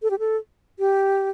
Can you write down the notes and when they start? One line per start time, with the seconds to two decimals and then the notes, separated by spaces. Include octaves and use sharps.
0.03 A4
0.11 G4
0.19 A4
0.79 G4